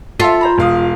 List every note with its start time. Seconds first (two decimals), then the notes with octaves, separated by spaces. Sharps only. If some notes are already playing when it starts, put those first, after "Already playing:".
0.20 F4 A4 E5
0.41 C5 A#5 B5
0.58 E1 F5 D#6